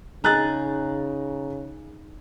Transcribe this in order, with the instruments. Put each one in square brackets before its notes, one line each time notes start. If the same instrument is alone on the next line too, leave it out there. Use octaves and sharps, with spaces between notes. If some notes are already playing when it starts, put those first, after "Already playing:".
[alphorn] C#3 [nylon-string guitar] D#4 G#4 [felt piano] A#5 F#6 A6